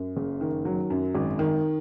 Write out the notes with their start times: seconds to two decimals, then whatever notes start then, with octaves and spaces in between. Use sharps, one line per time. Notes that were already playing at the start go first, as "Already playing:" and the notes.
Already playing: F#2
0.17 F#1
0.41 D#3
0.65 F#3
0.90 F#2
1.15 G#1
1.39 D#3